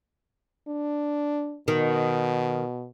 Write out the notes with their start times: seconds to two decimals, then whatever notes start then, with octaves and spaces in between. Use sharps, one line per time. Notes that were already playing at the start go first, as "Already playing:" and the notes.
0.68 D4
1.68 B2 D#3